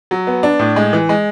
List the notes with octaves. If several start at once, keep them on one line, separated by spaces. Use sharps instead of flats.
F#3
B3
D4
A2
G#3
E3
G#3